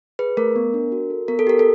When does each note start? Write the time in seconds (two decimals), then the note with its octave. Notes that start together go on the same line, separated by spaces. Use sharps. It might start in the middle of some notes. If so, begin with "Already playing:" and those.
0.19 G#4 B4
0.37 A3 A#4
0.56 B3
0.74 D4
0.92 F#4
1.10 A4
1.28 B3 A#4
1.39 A4
1.47 G4 A#4
1.59 A4